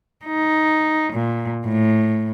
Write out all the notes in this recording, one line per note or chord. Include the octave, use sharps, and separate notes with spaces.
D#4
A#2
A2